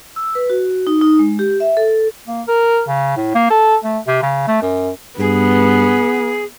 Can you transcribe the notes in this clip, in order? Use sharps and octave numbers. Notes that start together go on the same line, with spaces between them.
E6
B4
F#4
D#4
D#4
G#3
G4
E5
A4
A#3
A#4
C#3
A2
A#3
A4
A3
C3
C#3
A3
F#2
G2 B3 G#4